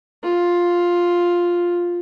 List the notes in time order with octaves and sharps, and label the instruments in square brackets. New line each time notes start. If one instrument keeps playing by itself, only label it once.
[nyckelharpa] F4